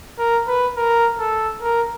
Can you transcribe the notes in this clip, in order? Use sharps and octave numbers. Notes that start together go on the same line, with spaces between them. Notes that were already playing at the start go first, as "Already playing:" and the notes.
A#4
B4
A#4
A4
A#4